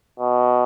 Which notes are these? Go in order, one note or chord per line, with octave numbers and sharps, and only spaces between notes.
B2